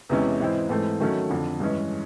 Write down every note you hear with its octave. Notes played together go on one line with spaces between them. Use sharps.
E2 C3 E3 G#3 C#4
G#2 E3 G#3 C4 E4
G#2 E3 A3 C4
D#3 F#3 A3 C#4
F2 D3 F3
G2 E3 G#3 C#4